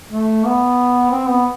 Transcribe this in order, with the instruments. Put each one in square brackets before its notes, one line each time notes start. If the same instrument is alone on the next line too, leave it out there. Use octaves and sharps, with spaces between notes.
[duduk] A3
B3
C4
B3